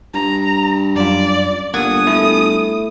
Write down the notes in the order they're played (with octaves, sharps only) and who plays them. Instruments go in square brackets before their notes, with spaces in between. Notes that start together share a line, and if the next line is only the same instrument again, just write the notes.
[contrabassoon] G2 [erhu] A#5
[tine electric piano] F#2 F4 [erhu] D5
[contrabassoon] G1 [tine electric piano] A#3 F#5 G#6 [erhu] D#6
[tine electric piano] A3 E4